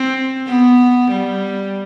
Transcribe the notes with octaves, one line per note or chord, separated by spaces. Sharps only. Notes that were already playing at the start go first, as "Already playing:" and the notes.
Already playing: C4
B3
G3